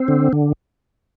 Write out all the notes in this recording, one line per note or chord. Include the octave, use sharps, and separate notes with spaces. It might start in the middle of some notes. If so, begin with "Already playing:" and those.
Already playing: C4
D3
D3